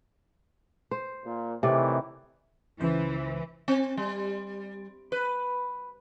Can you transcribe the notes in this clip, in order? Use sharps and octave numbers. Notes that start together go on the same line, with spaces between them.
C5
A#2
A2 C3 D#3 E3 D5
C#2 E3 C5
C4
G3
B4